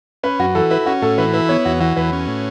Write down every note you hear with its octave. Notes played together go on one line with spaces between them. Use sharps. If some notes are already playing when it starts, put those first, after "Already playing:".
C#4 B4
F#2 F#4
E3 A4
E4 B4
C#4 F#4
A2 A4
E3 B4
E4 B4
B3 C#5
E2 F#4
E3 F#4
E2 B4
C#4
A2